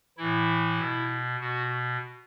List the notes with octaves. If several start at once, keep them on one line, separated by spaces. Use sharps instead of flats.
A2 E3 E4
B2
B2 F#4